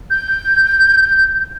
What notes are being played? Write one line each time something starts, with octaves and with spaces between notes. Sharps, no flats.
G6